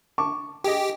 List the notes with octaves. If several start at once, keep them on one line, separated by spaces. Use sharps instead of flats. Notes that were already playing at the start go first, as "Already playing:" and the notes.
A5 C#6 D6
G4 G#4 D#5